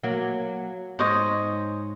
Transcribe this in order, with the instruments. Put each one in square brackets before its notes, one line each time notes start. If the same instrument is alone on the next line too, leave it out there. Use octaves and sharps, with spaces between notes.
[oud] F#3 A#3
[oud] G#2 [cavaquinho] C5 C#5 D#5